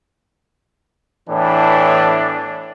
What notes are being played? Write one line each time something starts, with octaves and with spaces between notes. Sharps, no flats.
E2 A2 E3 D4